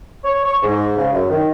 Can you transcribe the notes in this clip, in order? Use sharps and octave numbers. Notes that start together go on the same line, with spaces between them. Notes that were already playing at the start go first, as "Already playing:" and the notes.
C#5
C#6
G#2
C#3
F#2
D#3